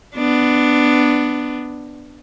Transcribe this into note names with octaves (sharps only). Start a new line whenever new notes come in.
B3 D4